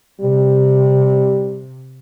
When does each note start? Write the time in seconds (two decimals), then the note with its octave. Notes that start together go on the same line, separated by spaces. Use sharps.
0.21 C3 G3